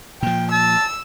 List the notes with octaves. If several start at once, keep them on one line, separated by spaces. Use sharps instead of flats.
A#2 F3 G5
A5 E6